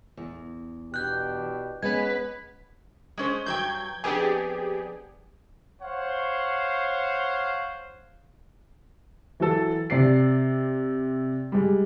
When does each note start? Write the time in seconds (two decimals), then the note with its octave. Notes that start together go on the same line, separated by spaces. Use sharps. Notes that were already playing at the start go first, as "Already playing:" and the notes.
0.17 E2
0.94 B2 D4 G4 F#6 G6
1.83 G#3 B3 C#4 B4 G#6
3.17 G#3 C#4 C5
3.46 G2 F#3 G5 G6 G#6
4.04 F2 B3 D4 G4 G#4
5.82 C5 C#5 F5 F#5
9.40 E3 F#3 A4
9.90 C3 D5 C7
11.52 G3 G#3